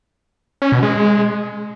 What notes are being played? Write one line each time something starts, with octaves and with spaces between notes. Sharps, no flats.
C#4
B2
G#3